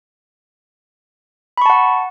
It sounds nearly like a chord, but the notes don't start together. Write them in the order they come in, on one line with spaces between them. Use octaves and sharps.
B5 C#6 A5 F#5